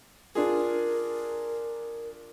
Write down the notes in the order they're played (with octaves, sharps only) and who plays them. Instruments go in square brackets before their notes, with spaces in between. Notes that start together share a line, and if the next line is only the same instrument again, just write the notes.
[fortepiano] D4 F4 G#4 [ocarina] A#4